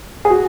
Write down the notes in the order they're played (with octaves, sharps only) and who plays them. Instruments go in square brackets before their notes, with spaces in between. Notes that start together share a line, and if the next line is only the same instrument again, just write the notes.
[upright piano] G#4
F#4